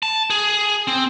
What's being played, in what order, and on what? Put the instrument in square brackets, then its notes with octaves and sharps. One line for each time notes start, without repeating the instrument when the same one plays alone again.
[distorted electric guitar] A5
G#4
C4